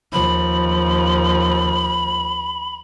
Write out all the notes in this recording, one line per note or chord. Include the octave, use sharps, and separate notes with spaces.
D#2 F3 B5